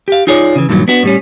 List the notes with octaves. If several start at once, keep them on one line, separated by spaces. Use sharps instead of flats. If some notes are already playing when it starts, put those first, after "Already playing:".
G4 F5
D#4 F4 G#4 C#5 D5
C#3 E3
G2 A#2 D#3 E3 F#3
B3 D4 F#4
A2 G3 C#4